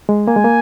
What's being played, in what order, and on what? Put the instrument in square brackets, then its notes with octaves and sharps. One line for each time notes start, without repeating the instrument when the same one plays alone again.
[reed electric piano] G#3
[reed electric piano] A#3 [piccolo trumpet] G#5
[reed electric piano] G#3
A#3